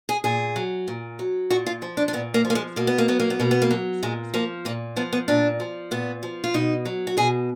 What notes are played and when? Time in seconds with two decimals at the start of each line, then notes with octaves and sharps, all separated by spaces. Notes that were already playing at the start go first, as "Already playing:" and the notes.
0.09 G#4
0.24 A#2 G#4
0.56 F#3
0.88 A#2
1.19 F#3
1.50 A#2 F#4
1.66 F4
1.82 F3
1.97 D4
2.08 D4
2.13 A#2 B3
2.34 A#3
2.45 F3
2.50 A#3
2.55 G#3
2.76 B2 A#3
2.87 B3
2.98 A#3
3.08 F#3 B3
3.20 A#3
3.30 B3
3.40 B2 A#3
3.51 B3
3.62 A#3
3.71 F#3
4.03 A#2 G#3
4.34 F3 A#3
4.65 A#2 A#3
4.96 F3 B3
5.13 B3
5.28 A#2 D4
5.60 F3
5.91 A#2 B3
6.23 F3
6.44 F4
6.54 B2 D#4
6.85 F#3
7.07 F#4
7.17 B2 G#4